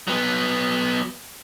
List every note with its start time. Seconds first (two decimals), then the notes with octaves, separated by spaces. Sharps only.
0.08 F#3 B3